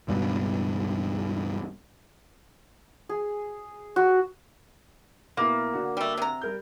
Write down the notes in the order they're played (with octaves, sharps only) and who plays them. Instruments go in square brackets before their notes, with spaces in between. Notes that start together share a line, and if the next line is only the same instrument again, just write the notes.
[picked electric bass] C#2 G2 B2
[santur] G#4
F#4
[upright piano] B2 E4 [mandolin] A#3
[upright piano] D3 F#4
[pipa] G3 A3
C3 A#5
[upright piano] G3 A#4 G6